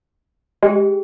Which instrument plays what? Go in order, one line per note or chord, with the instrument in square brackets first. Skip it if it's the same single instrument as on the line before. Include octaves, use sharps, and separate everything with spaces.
[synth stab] G#3 [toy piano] G4 G#4 G5